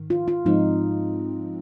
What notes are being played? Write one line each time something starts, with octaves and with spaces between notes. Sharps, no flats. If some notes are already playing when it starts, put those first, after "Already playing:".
Already playing: G#2 D#3
F4
F4
G#2 F3 G#3 C4 D#4